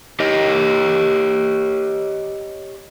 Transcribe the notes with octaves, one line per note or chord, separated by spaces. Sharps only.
G4 C#5 D#5